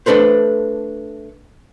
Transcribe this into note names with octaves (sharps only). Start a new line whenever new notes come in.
A3 D4 A4 B4 C5